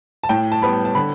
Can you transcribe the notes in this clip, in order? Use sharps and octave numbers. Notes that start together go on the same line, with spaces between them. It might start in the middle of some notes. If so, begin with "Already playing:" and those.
A5
A2 G5
A5
G3 B3 B5
A5
D3 B5